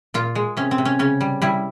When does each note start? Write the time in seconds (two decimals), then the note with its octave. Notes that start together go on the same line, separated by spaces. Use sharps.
0.14 A#2 F4
0.35 G#3
0.57 C3 C#4
0.71 C4
0.78 C3
0.85 C#4
0.99 C#3 C#4
1.21 G3
1.42 G3 E4